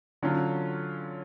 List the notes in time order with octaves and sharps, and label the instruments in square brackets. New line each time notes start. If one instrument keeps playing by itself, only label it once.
[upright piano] D3 F#3 C#4 F4